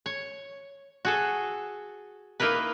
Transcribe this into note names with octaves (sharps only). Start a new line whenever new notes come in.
C#5
F#4 G#4 A4
A#3 D#4 E4 A#4 B4